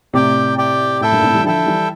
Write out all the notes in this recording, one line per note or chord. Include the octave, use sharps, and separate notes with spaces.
A2 C3 G4 D5 G5
G4 D5 G5
A2 E4 A4 E5 G5
G2 A#2
A2 C3
E3 G3
D3 F3 E4 A4 E5 G5
E3 G3